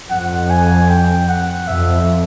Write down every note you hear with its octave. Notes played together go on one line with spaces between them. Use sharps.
F2 F#5
G#5
G5
F#5
F2 E5